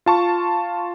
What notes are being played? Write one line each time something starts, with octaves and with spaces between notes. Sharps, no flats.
F4 A5 C#6